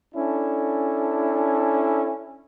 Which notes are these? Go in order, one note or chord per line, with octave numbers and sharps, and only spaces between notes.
C#4 D4 E4 A4